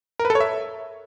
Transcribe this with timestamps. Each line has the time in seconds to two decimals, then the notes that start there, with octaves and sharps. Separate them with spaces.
0.19 A#4
0.25 B4
0.30 A4
0.35 C#5
0.40 E5